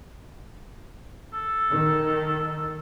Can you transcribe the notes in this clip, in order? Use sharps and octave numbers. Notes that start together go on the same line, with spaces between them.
A4
D#3